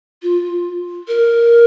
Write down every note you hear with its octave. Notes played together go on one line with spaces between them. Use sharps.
F4
A#4